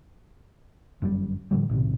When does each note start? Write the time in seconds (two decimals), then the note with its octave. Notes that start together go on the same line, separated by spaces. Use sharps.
1.02 G1 F#2 A2 G3
1.51 A2 D3 F3 G3
1.69 B1 A2 C3 D#3